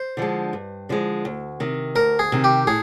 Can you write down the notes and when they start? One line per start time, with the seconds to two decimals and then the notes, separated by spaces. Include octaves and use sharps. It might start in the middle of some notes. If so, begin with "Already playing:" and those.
Already playing: C5
0.17 D3 F3 G#3
0.53 G2
0.89 D3 F3 G#3
1.25 D2
1.60 C3 D#3
1.95 D2 A#4
2.19 G#4
2.32 C3 D#3
2.44 G4
2.67 A2 G#4